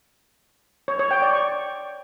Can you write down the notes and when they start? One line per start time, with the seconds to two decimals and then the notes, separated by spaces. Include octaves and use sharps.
0.88 C#5
0.99 C#5
1.11 G5
1.22 D5
1.33 C#6